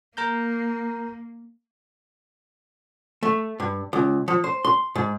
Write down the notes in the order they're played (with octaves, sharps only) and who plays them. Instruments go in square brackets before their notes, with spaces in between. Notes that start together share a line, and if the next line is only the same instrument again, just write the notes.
[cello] A#3 [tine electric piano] A#4 A#5 G6
[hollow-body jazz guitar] A3
G2
C#2
F3
C5
C6
G#2